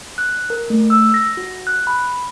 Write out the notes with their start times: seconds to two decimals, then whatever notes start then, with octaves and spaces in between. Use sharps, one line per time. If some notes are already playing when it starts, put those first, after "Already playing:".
0.18 F#6
0.50 A#4
0.70 A3
0.90 E6
1.14 A#6
1.37 F#4
1.67 F#6
1.87 B5